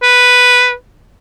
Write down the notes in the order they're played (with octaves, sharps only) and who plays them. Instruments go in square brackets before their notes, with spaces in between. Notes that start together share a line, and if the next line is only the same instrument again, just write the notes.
[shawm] B4